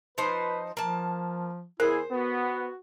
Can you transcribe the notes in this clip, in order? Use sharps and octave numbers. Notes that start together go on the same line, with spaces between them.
F3 D#4 B4 C5
F3 A#3 A5
E2 E4 G#4 A#4 C5
B3 F#4